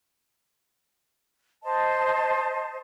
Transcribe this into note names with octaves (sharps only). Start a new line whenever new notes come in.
C5 D#5 A5